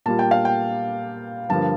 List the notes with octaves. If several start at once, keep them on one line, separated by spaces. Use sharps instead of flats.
A#2 G3 A#3 F4 A5
G5
F5
G5
G2 D3 F3 A#3 A5